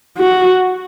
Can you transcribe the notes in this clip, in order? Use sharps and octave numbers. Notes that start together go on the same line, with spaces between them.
F#4